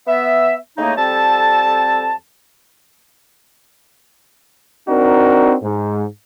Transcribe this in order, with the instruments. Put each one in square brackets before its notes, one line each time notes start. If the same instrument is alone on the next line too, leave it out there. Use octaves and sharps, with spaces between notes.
[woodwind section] B3 E5
A2 C#3 A3 A#3 D#4
F2 G3 C4 A4 A5
[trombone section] C4 D4 D#4 F#4 A#4
G#2